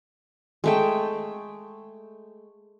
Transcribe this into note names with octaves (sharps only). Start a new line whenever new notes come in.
G#3 A3 G5